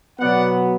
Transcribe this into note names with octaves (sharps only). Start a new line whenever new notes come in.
B2 F#3 B3 D5 F#5